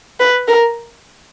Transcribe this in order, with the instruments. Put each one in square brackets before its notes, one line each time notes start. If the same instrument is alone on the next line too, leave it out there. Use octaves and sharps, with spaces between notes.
[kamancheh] B4
A#4